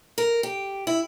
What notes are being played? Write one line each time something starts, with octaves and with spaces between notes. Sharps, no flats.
A#4
G4
E4